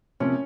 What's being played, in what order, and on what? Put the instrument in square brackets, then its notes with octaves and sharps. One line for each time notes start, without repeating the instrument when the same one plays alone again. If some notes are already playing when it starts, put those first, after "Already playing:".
[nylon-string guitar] C3 F3 A#3 [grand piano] C#4